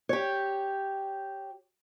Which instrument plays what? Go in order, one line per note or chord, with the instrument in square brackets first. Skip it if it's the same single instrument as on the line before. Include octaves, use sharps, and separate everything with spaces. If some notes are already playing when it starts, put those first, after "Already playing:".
[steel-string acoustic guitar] G4 C#5